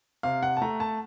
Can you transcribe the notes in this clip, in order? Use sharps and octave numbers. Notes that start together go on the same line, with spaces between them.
C3 F5
F#5
A5
A3 A#5
A5